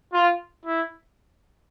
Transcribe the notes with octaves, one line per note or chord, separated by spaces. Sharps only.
F4
E4